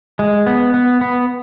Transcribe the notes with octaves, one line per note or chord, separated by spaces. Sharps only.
G#3
B3
B3
B3